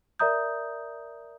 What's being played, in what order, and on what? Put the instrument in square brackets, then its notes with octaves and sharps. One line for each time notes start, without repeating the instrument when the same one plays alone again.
[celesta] A#4 D5 E5 A#5 D#6 G6